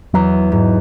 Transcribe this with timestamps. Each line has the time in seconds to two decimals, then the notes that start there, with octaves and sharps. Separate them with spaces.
0.14 E2 F#3
0.52 G#2 F#3